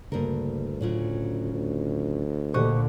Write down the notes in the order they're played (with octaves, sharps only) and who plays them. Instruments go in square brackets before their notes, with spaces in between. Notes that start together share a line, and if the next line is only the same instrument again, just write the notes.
[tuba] D2 [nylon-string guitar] G2 A#4 [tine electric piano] C#3 A#3
[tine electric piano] A2 F4 [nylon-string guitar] C#3 F#3 C#4
[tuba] D2
[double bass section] A#2 D3 [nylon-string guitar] G4 D#5 [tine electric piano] C5 C#6 F#6